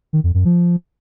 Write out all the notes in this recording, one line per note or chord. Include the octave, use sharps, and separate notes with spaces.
D#3
F2
F#2
F3